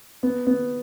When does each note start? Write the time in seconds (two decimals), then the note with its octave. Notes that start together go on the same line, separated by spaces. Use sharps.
0.23 B3
0.47 B3